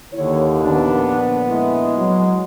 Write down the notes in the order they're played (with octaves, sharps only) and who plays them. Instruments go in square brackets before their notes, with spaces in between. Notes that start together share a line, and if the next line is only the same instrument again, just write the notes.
[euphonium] D#2 [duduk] D3 [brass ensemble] E4 C#5
[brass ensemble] A#1 D3 B3 [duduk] D4
[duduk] G#3 [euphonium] E4
[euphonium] F#3